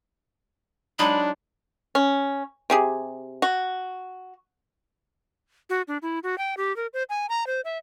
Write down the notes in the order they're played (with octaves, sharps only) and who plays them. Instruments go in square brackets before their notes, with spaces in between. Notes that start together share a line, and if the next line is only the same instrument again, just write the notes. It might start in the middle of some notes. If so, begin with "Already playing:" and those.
[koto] F#3 G#3 D#4 [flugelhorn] D4 [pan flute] B5
[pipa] C#4
C3 G4 G#4
F#4
[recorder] F#4
D4
E4
F#4
G5
G4
A#4
C5
G#5
A#5
C5
E5